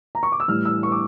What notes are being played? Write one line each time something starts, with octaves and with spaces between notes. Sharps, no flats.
A#5
C#6
D6
E6
A2 E3 G3 F6
E6
C#6
D6